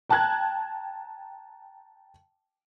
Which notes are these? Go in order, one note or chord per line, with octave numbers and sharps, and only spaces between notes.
G5 A5 A#5 F#6 G#6